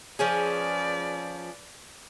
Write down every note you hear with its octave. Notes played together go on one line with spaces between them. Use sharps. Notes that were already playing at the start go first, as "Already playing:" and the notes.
F3 C#4 G#4 B4 D5